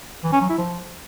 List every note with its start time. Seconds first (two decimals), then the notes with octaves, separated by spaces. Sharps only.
0.24 E3
0.32 C#4
0.41 F#3
0.49 E4
0.58 F3